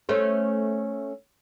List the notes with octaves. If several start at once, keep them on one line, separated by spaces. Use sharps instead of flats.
A3 C#4 C5